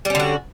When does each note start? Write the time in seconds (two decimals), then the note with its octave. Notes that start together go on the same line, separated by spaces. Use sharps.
0.05 G3
0.10 C#4
0.15 D3
0.20 F#4